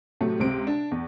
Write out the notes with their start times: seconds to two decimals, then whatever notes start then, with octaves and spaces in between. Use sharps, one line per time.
0.21 A2 C3 F#3 A3
0.40 C#2 C3 C4 D7
0.67 D4
0.91 E2